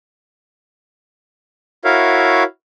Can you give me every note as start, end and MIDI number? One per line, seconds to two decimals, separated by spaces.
1.85 2.43 64
1.85 2.43 66
1.85 2.43 70
1.85 2.43 73
1.85 2.43 76
1.85 2.43 77